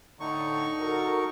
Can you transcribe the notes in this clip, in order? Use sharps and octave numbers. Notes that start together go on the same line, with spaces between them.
A2 D3 D#4 C#6
F#4 A4 A#4